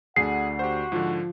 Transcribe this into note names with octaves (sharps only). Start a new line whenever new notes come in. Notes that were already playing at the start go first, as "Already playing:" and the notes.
D2 D3 G#4 F#5 C7
F#4 G4 C5
G#2 D3 F3